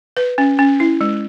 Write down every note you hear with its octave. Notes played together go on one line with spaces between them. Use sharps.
B4
C#4
C#4
E4
G#3